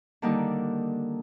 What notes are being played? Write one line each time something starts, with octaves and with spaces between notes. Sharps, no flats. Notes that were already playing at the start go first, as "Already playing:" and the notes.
D3 D#3 G3 A#3 D4 D#4